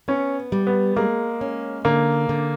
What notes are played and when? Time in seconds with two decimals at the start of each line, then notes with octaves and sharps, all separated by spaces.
0.08 B3 C#4
0.52 G3
0.67 B3
0.96 G#3 A#3
1.41 C#4
1.85 D3 A#3
2.29 D3